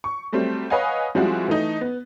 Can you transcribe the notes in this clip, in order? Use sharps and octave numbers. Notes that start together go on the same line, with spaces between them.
C#6
F#3 G3 A3 C4
B4 C#5 D#5 F5 F#5 G#5
F3 G3 G#3 C4 E4 F#4
E3 A3 D#4 D#5
B3